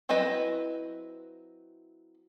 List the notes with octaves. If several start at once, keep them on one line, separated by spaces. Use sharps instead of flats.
F#3 C4 E4 B4 D#5